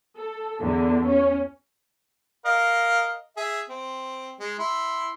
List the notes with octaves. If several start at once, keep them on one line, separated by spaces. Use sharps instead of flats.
A4
E2 D3
C#4
A#4 D#5 F5
G#4 E5
C4
G#3
E4 C6